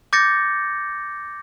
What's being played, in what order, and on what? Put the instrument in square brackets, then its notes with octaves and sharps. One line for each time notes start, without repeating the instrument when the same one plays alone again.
[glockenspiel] D6 G6 A6 A#6 C#7